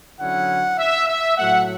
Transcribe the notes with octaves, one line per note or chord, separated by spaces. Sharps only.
D3 F#3 C#4 E4 F#5
E5
E5
A2 F#3 A3 F#5